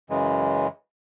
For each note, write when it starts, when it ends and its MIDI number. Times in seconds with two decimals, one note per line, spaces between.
0.10 0.67 42
0.10 0.67 49
0.10 0.67 52
0.10 0.67 56